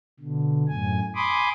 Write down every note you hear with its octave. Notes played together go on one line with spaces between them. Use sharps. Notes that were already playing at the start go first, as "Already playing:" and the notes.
B2 D3
F#2 A2 G#5
G#5 B5 C6 D6 D#6